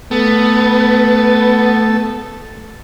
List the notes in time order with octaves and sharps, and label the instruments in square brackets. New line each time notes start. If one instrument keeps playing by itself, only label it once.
[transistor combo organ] A3 A4 [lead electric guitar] B3